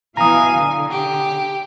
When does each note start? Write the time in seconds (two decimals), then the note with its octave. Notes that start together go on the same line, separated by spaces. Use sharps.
0.17 B2 E3 F5 G#5 A#5 D#6
0.55 D3
0.91 G4